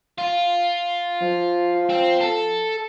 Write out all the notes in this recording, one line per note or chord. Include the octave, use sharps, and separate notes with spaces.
F4
F3
C4
A4